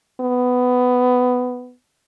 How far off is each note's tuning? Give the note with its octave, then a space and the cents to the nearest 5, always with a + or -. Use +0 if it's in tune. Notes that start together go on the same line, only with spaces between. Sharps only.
B3 +15